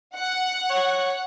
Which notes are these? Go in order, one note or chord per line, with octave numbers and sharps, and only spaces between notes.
F#5
C#5